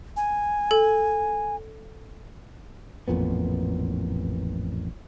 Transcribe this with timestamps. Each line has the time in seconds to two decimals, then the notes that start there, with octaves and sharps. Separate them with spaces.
0.17 G#5
0.71 A4
3.08 A1 F2 A#2 B3